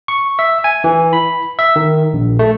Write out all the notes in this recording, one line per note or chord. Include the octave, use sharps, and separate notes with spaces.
C#6
E5
G#5
E3
B5
E5
D#3
A#1
A3